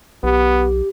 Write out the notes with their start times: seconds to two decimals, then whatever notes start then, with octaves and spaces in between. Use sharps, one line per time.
0.23 B1 B3 G4